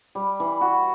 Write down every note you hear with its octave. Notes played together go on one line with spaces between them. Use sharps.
G3
E3
F#4